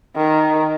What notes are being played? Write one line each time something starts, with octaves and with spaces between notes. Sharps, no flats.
D#3